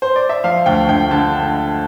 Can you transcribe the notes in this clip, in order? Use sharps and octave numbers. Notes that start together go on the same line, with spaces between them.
C5
D5
E5
F3 F5
D2 G5
D2 G5
D3 A5